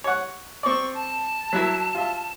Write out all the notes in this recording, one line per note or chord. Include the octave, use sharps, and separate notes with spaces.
C#5 F#5
C4 D5 C#6
A5
F#3 E4 A#4
F4 E5